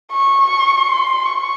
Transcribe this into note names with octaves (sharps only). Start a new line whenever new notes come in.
C#6
C6
C#6